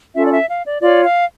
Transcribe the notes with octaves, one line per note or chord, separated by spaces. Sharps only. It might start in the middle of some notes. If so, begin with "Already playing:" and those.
C#4 F4 A4 E5
D5
E5
F5
D5
F4 C#5 D5
F5